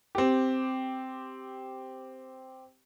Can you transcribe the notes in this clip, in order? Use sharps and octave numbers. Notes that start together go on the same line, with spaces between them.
C4 G4